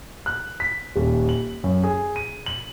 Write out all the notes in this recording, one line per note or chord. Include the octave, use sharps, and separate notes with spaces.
F#6
B6
D#1
F#7
F#2
G#4
D#7
F#7